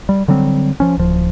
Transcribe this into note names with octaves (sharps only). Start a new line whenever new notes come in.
G3
D3 F#3 G3 C4
F3 C#4
D1 F3